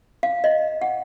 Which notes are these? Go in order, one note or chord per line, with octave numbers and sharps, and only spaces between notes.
F5
D#5
F#5